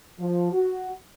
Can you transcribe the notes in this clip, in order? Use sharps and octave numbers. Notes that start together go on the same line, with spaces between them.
F3
F#4